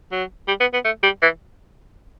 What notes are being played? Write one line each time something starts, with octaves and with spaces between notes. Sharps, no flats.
F#3
G3
B3
B3
A3
G3
E3